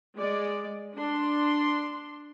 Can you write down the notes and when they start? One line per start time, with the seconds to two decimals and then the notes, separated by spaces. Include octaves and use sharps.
0.18 G#3 D5
0.96 D4 C6